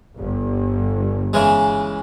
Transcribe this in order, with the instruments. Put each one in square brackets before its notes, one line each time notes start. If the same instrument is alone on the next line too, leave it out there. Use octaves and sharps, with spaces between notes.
[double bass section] G1
[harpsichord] C#3 E3 G#3